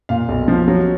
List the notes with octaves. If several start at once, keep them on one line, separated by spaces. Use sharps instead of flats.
A#2 F5
B1
F3
F#3